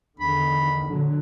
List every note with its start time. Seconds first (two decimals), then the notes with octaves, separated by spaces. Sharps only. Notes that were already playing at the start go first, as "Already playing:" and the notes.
0.20 E2 D3 D#3 B5
0.86 A#2 D3 F#3